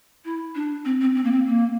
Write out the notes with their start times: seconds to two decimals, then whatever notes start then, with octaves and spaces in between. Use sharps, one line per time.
0.25 E4
0.55 D4
0.85 C4
1.01 C4
1.15 C4
1.24 A#3
1.31 C4
1.46 A#3